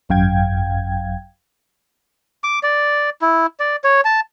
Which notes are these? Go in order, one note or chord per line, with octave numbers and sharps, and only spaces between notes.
G#1 F#2 F5 G5 G#6
D6
D5
E4
D5
C#5
A5